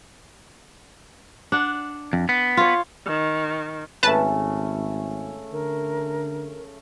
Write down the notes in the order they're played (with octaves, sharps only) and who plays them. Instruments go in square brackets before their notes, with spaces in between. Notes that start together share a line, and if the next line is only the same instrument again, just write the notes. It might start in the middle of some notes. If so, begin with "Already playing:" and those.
[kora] D4 F#5
[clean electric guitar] F2
B3
[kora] F4 C#5
[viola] D#3
[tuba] G#1 [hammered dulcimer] C#3 A3 [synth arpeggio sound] B4 A5
[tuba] D3 [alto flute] A#4